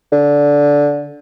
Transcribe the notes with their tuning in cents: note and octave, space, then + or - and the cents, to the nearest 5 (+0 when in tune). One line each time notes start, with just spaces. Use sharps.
D3 -15